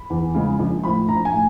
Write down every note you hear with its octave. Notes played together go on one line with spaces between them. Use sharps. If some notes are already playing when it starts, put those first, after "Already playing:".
Already playing: B5
E2
C#3 F3 G#3
A#1
A2 F3 B5
A#1 A#5
G#5
A2